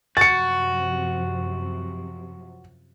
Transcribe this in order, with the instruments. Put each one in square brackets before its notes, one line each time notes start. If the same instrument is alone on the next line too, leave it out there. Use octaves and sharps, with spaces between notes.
[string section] F#2 C3 F3 [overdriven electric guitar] F#4 [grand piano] A6 C#7